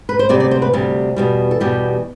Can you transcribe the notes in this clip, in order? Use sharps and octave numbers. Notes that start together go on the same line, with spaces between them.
B4
C5
D2 C3 G3 D5
D5
C5
B4
D2 C3 G3
E2 B2 G3
A4
E2 B2 G3 G4